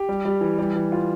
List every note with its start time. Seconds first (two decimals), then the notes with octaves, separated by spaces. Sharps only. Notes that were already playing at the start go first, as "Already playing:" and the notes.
Already playing: G4
0.09 G3
0.25 G3
0.41 E3
0.59 G3
0.75 E3
0.92 F4